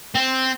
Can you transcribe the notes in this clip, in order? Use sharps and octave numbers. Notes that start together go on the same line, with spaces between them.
C4